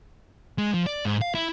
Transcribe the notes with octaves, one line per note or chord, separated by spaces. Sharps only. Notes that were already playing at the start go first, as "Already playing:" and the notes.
G#3
F3
D5
G#2
F5
E4